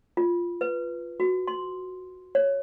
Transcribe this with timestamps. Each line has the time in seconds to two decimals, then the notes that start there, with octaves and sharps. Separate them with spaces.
0.17 F4
0.61 B4
1.20 F#4
1.48 C6
2.35 C#5